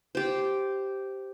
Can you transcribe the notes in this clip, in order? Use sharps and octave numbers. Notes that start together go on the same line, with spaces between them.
G4 C5